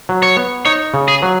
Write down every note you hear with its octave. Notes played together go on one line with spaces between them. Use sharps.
F#3
C#5
B3
D#4 C#5
C#3
G#4
F#3